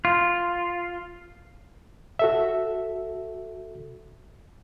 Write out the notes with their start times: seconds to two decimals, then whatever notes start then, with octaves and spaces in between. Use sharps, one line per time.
0.05 F4
2.19 F#4 A4 E5